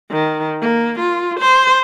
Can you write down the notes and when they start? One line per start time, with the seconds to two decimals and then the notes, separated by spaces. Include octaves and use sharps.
0.11 D#3
0.62 A#3
0.99 F4
1.40 C5